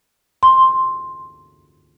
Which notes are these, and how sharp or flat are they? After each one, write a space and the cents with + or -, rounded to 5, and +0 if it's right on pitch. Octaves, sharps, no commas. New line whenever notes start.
C6 +5